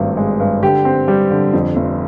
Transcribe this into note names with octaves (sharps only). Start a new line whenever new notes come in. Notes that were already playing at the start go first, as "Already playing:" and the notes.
Already playing: G#1 G2 A3
G#3
G2
D3 G4
C4
G3
D3
F2
F1